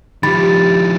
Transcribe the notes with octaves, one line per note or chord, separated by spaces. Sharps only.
D#3 F3 G4 B5 A6